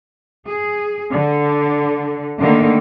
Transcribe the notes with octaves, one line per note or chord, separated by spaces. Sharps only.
G#4
D3
D3 D#3 A3 A#3